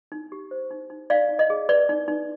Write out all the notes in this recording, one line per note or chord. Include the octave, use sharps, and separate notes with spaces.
D#4
G4
C5
D#4
D#4
D#4 D5 F5
D#4
D#5
G#4
B4 D5
D#4
D#4